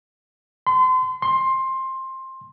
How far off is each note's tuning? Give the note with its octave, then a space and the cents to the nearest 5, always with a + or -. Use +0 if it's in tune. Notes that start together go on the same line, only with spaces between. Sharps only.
C6 -35
C6 +15